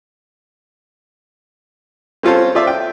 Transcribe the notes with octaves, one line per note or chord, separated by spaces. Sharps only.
C4 C#4 F4 A4 C5
F4 C5 D5 E5
G5